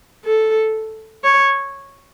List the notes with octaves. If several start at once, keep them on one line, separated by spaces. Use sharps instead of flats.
A4
C#5